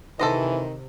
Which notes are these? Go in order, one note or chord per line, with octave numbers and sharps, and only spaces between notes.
C3 D#3 E3 A4 C5 D#5